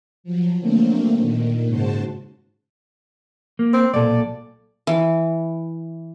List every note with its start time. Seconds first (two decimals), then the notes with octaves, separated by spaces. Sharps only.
0.24 F3 F#3
0.60 D3 F#3 A3 A#3 C4
1.18 A#2 D#3
1.67 G#2 C#3 F#4 C5 A5
3.59 A#3
3.74 C4
3.93 B1 A#2 A4 D5
4.87 E3